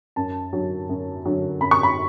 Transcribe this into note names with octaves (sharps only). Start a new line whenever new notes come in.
F#2 A5
D3 F#3
F#2
D3 F#3
F#2 B5
C#6
B5